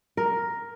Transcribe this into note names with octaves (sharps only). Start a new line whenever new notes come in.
A#4